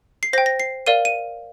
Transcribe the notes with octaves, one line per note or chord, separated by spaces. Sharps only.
C7
C5 G5 A#6
A#6
C7
A#4 D5 F5 D#7
D#7